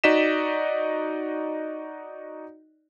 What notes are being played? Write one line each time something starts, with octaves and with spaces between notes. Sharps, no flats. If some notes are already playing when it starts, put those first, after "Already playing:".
D#4 F#4 D5 D#5 B6 E7